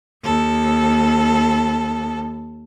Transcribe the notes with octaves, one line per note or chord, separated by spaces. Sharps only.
D#2 A4